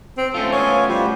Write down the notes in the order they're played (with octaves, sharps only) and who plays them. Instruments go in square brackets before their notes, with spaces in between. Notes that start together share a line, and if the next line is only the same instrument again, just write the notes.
[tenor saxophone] C4
[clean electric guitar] A3 C#4 F4 [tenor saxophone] A4
[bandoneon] B3 F5 G#5 [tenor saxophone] C#5
[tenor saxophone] F3 [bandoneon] G3 F#4 G4